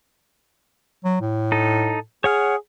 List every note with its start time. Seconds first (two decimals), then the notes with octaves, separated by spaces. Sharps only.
1.05 F#3
1.21 A2
1.52 D#4 A4
2.24 G#4 C#5 F#5 F6